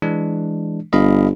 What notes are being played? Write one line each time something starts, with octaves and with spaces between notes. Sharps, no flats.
E3 G#3 D4
G1 D#5 F5 B5